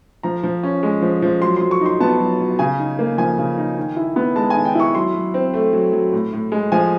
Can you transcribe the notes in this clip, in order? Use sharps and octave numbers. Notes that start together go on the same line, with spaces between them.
F3 A#5
F3
C#4
G#3
F3
F3
F#3 C6
F#3 C6
C#6
D#4 C6
B3 A5
F#3
F#3
C#3 G#5
D#4
A#3
F3 G#5
C#3
D#4
D#3
E4
B3
G#3 A5
G#5
D#3
G5
E4 C#6
F#3 C6
F#3
C4
A3
F#3
F#3
A2
A2
G#3
F3 G#5